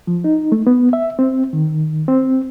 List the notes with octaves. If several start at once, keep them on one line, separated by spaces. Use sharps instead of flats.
F3
D#4
A3
B3
E5
C4
D#3
C4